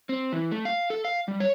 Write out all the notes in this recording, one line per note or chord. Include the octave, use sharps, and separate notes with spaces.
C4
E3
A3
F5
A4
F5
G3
C#5